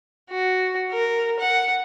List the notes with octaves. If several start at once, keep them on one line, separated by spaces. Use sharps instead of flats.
F#4
A#4
F#5